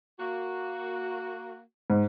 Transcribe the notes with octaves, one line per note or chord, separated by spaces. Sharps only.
A#3 F#4
G#2